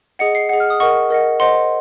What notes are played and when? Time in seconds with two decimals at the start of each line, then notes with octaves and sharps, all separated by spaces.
0.19 G#4 D#5 F#5 C#7
0.35 C7
0.49 G#4 D#5 F#5
0.60 F6
0.70 D#6
0.80 A#4 D#5 F#5 C#6
1.10 A#4 D#5 F#5
1.40 C5 D#5 F#5 C6